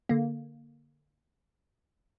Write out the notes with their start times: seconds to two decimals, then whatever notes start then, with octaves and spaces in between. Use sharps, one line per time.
0.09 D3 A#3